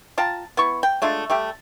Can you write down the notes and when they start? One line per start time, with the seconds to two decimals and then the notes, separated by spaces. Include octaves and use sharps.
0.18 F4 G5 A5 A#5
0.57 B3 E4 C#6
0.83 G5
1.02 G#3 A3 D4 F4
1.30 G3 A3 G4